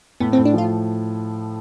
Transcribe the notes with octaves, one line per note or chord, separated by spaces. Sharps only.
A2 B3
C4
A2
D4
F3 F4